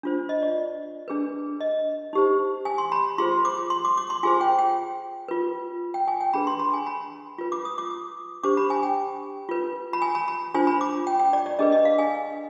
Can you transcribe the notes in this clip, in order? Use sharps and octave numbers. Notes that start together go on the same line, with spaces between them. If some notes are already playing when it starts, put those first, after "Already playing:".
D4 F4 C5
D#5
D5
D4 G#4 B4
D#5
D#4 G4 C5
G#5
C6
B5
F4 G#4 C5 C6
D6
C6
D6
D6
C6
F4 G#4 C5 G#5
G5
G5
F4 B4
G5
G#5
G5
D4 G#4 B4 B5
C6
B5
G#5
B5
F4 B4
D6
D#6
D6
D4 G4 C5 D6
B5
G#5
G5
F4 B4
B5
G#5
B5
B5
D4 F4 C5 G#5
B5
D6
G5
G5
D5
D5
D4 G#4 B4 D#5
D#5
F5
G#5